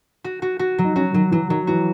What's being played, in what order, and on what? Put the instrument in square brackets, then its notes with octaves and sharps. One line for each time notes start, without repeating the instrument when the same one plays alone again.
[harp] F#4
F#4
F#4
F#3
[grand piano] D#4
[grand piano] C#4 [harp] F#4
[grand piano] D#3 [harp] F#3
[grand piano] E3 [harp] F#3
[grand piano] D#3 [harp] F#3
[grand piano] E3 [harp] F#4